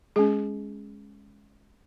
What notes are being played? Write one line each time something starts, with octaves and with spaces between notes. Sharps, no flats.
G#3 C#4 G#4